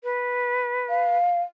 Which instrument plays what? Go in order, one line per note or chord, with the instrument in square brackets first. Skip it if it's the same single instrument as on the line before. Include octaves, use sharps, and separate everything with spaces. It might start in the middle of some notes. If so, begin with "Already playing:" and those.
[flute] B4
[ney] F5